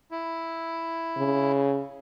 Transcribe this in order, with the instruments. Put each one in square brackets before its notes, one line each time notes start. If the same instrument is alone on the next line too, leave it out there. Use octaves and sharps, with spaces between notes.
[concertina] E4
[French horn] C#3